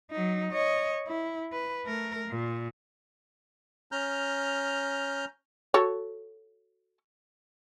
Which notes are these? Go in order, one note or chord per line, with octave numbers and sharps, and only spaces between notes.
F#3 D#4
C#5 D#5
E4
B4
A3 A#4
A#2
C#4 A#5 F6 G6
F#4 A4 C#5